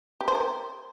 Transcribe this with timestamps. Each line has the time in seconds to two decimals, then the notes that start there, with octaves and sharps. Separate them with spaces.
0.21 G4
0.28 C5
0.35 A#4